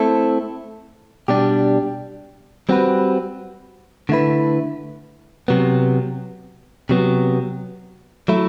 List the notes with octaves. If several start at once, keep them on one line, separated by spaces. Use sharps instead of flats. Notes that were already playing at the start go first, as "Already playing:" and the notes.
Already playing: A3 C4 E4 A4
B2 G3 D4 G4
G3 C4 F#4 B4
D3 A3 E4 B4
C3 F#3 B3
C3 F#3 B3
F#3 A3 E4